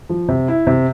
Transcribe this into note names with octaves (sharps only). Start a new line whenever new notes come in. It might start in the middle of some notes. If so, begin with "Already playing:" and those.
F3
C3
E4
C3